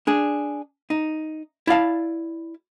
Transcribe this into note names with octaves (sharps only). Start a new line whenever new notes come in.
D4 G#4
D#4
E4 D5 F5 A5